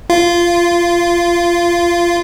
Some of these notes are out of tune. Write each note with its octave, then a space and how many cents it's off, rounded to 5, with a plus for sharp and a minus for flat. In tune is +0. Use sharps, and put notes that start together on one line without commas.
F4 -15